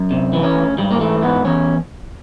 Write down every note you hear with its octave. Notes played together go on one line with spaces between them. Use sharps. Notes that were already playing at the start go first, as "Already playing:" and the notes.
Already playing: F#2
C3
E3
C#4
D2
G#2 G3
A#3
E3 A3
G#2 B3
E2 C#4